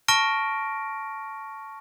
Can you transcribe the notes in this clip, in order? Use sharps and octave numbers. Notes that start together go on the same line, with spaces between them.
A5 C#6 F6 A#6 D7